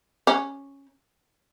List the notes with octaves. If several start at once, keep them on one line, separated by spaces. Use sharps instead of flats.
C#4